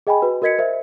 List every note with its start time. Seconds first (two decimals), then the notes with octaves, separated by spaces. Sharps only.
0.07 G#4 D#5 G5 G#5 B5
0.22 F#4 B4
0.42 F#4 A#4 D#5 G#6 B6 C#7
0.58 A#4 C5 E5